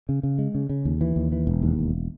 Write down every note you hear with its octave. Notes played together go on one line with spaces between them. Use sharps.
C#3
C#3
G#3
C#3
C#3
D#2
E3
D#2
E3
E1
D#2
E1